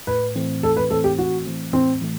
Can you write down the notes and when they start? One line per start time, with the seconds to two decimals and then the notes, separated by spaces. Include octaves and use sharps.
0.07 A2 B4
0.35 E3 A3 C4
0.63 A2 A4
0.77 B4
0.90 E3 A3 C4 A4
1.04 G4
1.18 A2 F#4
1.46 E3 A3 C4
1.73 A2 C4
2.01 E3 A3